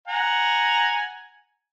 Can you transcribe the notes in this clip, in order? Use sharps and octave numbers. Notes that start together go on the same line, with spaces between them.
F#5 G#5 A#5